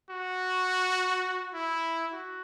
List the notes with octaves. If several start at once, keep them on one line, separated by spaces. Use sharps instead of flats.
F#4
E4
F#4